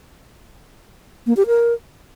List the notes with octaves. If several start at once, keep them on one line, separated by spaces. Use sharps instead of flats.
A#3
G4
A#4